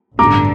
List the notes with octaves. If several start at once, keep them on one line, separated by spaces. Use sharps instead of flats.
A1 G2 D3 A#5 D6